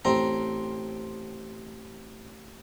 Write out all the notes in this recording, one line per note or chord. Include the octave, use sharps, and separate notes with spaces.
A1 C4 A#5